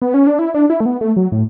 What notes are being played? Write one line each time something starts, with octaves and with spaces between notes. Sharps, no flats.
B3
C#4
D4
E4
D4
E4
A3
B3
A3
F#3
A2